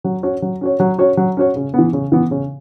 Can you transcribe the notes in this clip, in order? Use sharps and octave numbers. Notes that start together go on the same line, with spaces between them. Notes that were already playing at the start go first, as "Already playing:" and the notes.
F#3
C#4 F#4 C#5
F#3
C#4 F#4 C#5
F#3
C#4 F#4 C#5
F#3
C#4 F#4 C#5
C#3
E3 B3
C#3
E3 B3
C#3